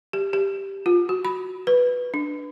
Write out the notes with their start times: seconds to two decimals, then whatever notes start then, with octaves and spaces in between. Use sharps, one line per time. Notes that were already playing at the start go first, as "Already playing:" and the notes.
0.13 G4
0.33 G4
0.86 F4
1.09 F#4
1.25 B5
1.67 B4
2.14 D4